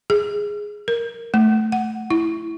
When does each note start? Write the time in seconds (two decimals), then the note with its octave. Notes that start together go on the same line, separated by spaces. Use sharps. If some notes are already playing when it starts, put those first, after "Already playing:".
0.10 G#4
0.88 A#4
1.34 A3
1.72 F#5
2.10 E4